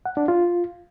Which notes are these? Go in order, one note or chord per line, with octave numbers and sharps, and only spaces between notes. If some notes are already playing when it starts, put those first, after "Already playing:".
F#5
D4
F4